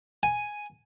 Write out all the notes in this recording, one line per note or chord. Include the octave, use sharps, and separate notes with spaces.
G#5